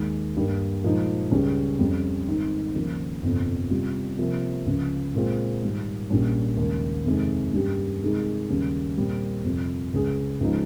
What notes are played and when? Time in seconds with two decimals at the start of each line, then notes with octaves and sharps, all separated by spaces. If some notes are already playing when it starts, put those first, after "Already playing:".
Already playing: D#2 D#3 G#3
0.36 G2 G3 A#3
0.84 A#2 F3 G#3 D#4
1.31 C#2 C#3 G3 C#4 G#4
1.79 F2 C#3 G3 C#4
2.28 G#1 G#2 D#3
2.74 D#2 C#3 F3 A#3 F4
3.23 G1 F2 C3 F3
3.70 C3 G3 C#4 F4
4.19 C3 F3 A#3
4.66 C#2 C#3 F3
5.15 A#2 G#3 C4 F4 G#4
5.62 G#2 D#3 G3
6.10 A#1 A#2 G3 C#4
6.57 D#2 C#3 G#3
7.06 F2 C3 D#3 G#3
7.53 G2 G3 A#3 C#4 G4
8.02 C3 D#3 G#3 D#4 G#4
8.50 D#2 C#3 G3 C#4
8.97 A#2 G3 C4
9.44 F2 C3 F3
9.93 C#2 C#3 G#3 C#4 G#4
10.40 C#2 C#3 F3 G#3 D#4